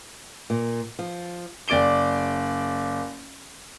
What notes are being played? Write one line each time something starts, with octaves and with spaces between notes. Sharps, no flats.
A#2
F3
F#1 D5 D6 D7 G7